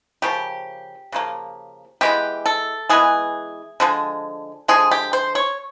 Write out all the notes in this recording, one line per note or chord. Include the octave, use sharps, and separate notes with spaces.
C#3 F3 A#3 G4
C#3 F3 A#3
E3 G#3 B3 G4
A4
E3 G#3 B3 G#4
D3 F3 G#3
D3 F3 G#3 G#4
G4
C5
C#5